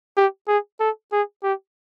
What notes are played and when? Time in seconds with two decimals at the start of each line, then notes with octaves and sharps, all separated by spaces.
0.17 G4
0.48 G#4
0.80 A4
1.12 G#4
1.43 G4